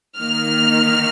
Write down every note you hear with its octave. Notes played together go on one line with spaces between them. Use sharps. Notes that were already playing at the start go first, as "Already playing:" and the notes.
D#3 A#3 D#4 F6